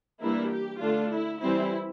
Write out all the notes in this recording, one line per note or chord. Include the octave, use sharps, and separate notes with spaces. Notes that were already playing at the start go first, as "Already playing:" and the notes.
E3 G3 A#3 D4 E4
G4
D3 A3 D4 F4
E4
E3 G3 C4 E4